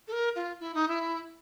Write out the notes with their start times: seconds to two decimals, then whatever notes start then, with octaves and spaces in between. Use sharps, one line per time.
0.08 A4
0.12 A#4
0.36 F4
0.60 E4
0.74 D#4
0.88 E4